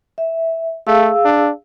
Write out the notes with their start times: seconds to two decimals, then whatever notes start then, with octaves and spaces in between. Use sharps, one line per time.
0.18 E5
0.87 A3 G#4 F5 E6
1.25 D4